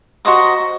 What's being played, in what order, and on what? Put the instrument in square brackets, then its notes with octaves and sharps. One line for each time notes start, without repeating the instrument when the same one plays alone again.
[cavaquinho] F#4 C5 D#5 A#5